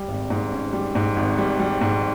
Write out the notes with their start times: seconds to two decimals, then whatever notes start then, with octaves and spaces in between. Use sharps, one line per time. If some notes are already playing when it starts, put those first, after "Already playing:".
Already playing: G3
0.08 G#1
0.30 G#2
0.52 C#4
0.73 G3
0.95 G#2
1.16 G#1
1.38 G3
1.60 G3
1.81 G#2